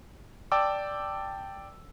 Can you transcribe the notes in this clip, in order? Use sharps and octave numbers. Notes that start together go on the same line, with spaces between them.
D5 G5 A5 D6 E6